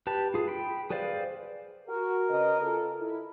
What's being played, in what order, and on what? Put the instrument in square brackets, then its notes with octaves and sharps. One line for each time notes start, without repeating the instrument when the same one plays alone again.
[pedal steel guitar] G4 B4 A5
F4 G#4
G5 B5
G#4 B4 C5 D5 F5
[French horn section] F#4 [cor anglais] A#4
[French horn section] C#3 B4 D#5
F4 A4
E4